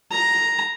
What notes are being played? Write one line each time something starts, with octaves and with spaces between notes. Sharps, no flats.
A#5